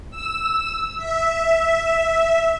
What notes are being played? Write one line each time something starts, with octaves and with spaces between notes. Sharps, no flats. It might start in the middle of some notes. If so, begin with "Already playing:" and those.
E6
E5